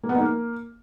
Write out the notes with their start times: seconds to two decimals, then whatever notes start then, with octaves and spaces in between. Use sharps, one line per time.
0.03 A#3
0.09 B3
0.15 D#4
0.21 A#3